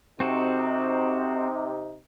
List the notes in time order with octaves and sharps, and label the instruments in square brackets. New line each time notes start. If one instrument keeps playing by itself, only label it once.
[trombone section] C3 D#4 [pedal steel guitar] C4 F#4 A4